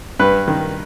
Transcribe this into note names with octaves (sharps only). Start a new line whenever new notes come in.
G2 B4
D#3